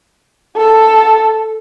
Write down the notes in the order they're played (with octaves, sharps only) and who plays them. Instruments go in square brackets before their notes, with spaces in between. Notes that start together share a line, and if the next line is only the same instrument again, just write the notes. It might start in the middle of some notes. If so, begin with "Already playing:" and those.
[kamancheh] A4